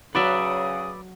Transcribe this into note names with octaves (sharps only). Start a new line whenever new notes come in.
C#3 F#3 F#4 B4 D5 E5 D#6